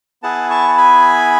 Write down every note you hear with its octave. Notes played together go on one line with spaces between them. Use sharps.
B3 E4 G#4 F#5 A5
A5 C#6
A5
G#5 B5